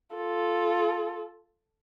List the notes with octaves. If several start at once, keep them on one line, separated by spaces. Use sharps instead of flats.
F4 A4